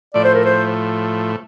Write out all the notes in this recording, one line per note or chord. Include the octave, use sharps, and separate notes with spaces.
A2 F3 A3 D5
C5
A#4
C5